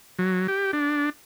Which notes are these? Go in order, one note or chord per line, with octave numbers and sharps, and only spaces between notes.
F#3
G4
D4